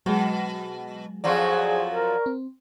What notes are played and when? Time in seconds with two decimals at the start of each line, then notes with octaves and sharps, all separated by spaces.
0.06 B2 F#3 G#3
1.24 F2 F3 F#3 G#4 D5 C6 C#6
1.91 A#4
2.26 C4